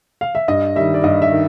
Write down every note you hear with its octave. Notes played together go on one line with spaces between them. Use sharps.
F5
E5
G2 D#5
D#3 G3 E5
D5
G2 D#5
E5
D#3